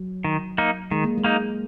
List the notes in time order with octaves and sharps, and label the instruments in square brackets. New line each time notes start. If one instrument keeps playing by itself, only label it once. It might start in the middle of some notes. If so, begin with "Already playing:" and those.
Already playing: [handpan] F#3
[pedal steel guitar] D#3
A#3 D#4
[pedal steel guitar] D#3 [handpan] G#3
[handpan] A#3
G#3
[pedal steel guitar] A#3 D#4